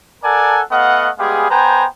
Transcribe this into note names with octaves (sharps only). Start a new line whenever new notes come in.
A4 A#4 D5 F#5 G#5 A5
A3 B3 D#5 F5 F#5
G3 G#3 B3 G4 G#4 F5
B3 B4 C5 G5 G#5 A#5